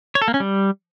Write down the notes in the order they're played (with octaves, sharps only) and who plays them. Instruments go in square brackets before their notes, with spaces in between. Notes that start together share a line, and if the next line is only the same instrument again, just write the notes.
[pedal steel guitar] C#5
A4
A#3
C#4
G3